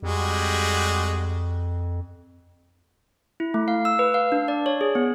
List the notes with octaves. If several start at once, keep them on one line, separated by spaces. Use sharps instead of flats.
F2 G3 G#3 F#4
E4
A3
F5
E6
B4
F5
D4
D5
C#5
G#4
B3